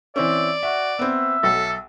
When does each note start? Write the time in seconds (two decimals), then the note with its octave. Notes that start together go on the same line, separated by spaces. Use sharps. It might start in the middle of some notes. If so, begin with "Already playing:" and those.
0.16 E3 C4 C#4 D5 E5
0.63 F#4 E5
0.99 B3 C4 E5
1.43 B1 A4